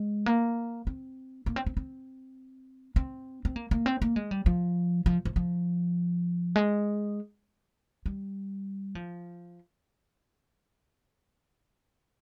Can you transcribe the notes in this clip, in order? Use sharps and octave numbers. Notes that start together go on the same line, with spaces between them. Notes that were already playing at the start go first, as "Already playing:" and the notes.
Already playing: G#3
A#3
C4
A#3
C4
C4
C4
C4
C4
A#3
A#3
C4
A#3
G#3
G3
F3
F3
F3
F3
G#3
G3
F3